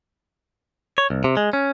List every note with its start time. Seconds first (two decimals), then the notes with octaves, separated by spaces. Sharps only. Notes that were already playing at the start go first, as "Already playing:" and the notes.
0.98 C#5
1.10 C2
1.24 C3
1.37 G#3
1.53 C#4